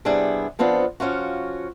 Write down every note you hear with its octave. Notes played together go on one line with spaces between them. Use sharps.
C3 G3 B3 D4 E4 G#4
F3 B3 C4 D4 F4
F3 C#4 F4 F#4